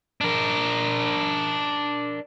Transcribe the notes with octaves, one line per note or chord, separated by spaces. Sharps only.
D4 A#4